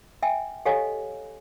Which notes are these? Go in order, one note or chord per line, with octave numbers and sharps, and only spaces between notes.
E5 G5 G#5
G4 A4 C#5 D#5 F5 G#5